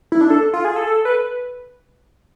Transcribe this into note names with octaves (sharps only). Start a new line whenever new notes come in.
E4
D4
A4
F4
G#4
A4
B4